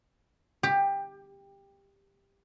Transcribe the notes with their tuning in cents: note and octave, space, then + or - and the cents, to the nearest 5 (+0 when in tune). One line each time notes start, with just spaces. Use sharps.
G4 +15